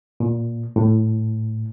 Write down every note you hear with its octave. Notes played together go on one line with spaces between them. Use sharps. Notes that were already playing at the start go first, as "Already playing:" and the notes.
A#2
A2